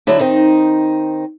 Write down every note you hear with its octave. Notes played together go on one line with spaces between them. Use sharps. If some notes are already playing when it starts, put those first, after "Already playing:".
D3 F#3 D#4 E4
D#3 C4 D#4